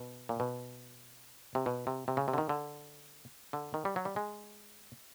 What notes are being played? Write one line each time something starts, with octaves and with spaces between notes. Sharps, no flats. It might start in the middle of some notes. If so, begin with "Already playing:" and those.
Already playing: B2
A#2
B2
C3
B2
C3
C3
C#3
C3
D3
D#3
D3
D3
D#3
G3
F#3
G3
G#3